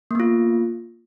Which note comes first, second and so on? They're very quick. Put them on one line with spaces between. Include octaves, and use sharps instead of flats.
A#3 B3 F4